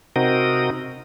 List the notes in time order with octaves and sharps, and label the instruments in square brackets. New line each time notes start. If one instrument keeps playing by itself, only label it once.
[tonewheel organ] C3 C4 D#4 F#4 A#4 D#6